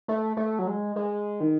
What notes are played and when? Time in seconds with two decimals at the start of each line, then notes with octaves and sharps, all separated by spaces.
0.08 A3
0.37 A3
0.59 F#3
0.67 G#3
0.96 G#3
1.40 D#3